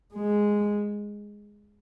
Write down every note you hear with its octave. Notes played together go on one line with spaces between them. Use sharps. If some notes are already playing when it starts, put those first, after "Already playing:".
G#3